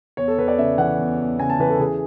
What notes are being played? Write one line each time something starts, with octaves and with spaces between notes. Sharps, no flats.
E2 C#5
A4
E2 B4
D5
C#3 E5
E3 F#5
E2
E2
C#3 G#5
A5
E3 B4
A4
E3 G#4